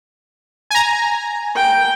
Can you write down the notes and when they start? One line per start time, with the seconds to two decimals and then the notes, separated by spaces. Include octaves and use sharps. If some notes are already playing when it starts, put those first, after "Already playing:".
0.71 G#5 A#5
1.56 G5